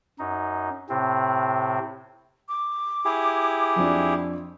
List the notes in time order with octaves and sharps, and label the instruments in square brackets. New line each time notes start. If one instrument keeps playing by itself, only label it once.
[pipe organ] F#2 D#4
A2 C3 C4
[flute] D6
[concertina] E4 G4 G#4
[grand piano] F2 F3 D4